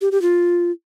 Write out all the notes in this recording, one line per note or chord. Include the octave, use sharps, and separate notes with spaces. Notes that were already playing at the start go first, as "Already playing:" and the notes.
G4
G4
F4